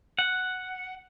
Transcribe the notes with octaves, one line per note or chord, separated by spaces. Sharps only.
F#5